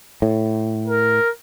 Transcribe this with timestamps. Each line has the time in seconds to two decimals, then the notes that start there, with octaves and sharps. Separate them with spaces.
0.22 A2
0.87 A#4